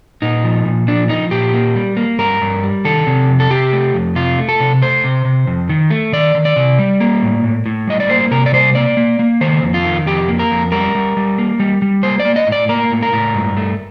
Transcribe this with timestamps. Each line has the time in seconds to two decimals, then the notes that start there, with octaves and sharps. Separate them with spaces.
0.22 A#2 D#4
0.44 F3
0.65 A#2
0.88 F3 D4
1.09 F3 D#4
1.31 A#2 G4
1.54 A#3
1.75 G3
1.97 A#3
2.19 G2 A#4
2.41 G2
2.63 G3
2.85 D#3 A4
3.07 C3
3.28 F2
3.40 A4
3.50 C3 G4
3.73 A3
3.94 F2
4.15 C3 F4
4.38 A3
4.49 A4
4.60 C3
4.82 A3 C5
5.04 C3
5.25 C3
5.47 F2
5.69 D#3
5.90 A3
6.12 D#3 D5
6.35 D#3
6.45 D5
6.56 C3
6.79 G3
7.01 A#3
7.23 A2
7.44 A2
7.66 A2
7.87 G3 D#5
8.00 D5
8.10 A#3 C5
8.31 C3 A#4
8.46 D5
8.53 G3 C5
8.75 A#3 D5
8.97 A#3
9.19 A#3
9.41 D#3 C5
9.62 F2
9.74 F4
9.85 D#3
10.06 F2 G4
10.28 A#3
10.39 A#4
10.51 F2
10.72 G3 A#4
10.95 G3
11.17 G3
11.39 A#3
11.60 G3
11.82 G3
12.03 A#3 C5
12.20 D5
12.25 A#3
12.36 D#5
12.47 A2
12.52 D5
12.69 A#3 A#4
12.91 A2
13.02 A#4
13.13 A2
13.35 G2
13.57 A3